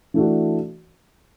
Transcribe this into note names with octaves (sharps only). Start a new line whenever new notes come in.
E3 A3 D4 F#4